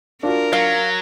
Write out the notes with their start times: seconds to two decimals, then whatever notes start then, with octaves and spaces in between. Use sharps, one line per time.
0.23 D4 F4 F#4 A#4
0.53 F#3 F5